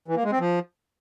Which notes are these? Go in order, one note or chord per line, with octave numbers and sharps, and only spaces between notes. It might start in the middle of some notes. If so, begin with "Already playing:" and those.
E3
A#3
G#3
C4
F3